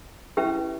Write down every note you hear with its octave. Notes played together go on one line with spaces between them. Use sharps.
C#4 E4 G4 B4 E5